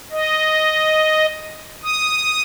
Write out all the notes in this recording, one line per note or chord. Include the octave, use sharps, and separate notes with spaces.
D#5
D#6